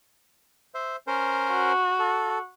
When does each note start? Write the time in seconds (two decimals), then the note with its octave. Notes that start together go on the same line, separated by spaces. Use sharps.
0.74 C5 E5
1.07 C#4 A#4 C5
1.52 F#4
1.99 A4